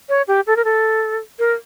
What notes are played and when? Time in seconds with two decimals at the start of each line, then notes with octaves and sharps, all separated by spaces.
0.09 C#5
0.28 G4
0.47 A4
0.56 A#4
0.64 A4
1.39 A#4